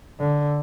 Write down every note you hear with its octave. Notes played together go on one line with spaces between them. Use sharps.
D3